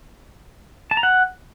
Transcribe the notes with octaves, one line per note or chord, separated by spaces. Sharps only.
A5
A#5
F#5